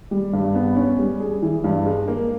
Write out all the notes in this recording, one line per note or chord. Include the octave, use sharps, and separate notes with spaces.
G3
G2
B3
C#4
G3
G#4
E3
G2
G#3
A#3